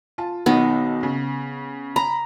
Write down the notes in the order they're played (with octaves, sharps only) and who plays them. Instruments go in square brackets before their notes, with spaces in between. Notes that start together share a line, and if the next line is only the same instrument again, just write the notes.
[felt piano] F4 A5
[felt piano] B1 D#3 D#4 [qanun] B3
[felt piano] C#3
[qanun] A#5 [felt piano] B5